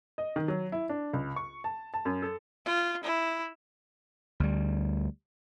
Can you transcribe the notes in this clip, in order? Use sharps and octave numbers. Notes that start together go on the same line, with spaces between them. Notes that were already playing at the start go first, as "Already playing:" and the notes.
D#5
D#3
F#3
E4
D4
C#2
C#6
A5
A5
F#2
A4
F4
E4
D2 G3